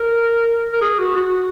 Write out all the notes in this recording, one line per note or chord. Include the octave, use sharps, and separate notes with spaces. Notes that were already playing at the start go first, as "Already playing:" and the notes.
Already playing: A#4
A#4
G#4
F#4
F#4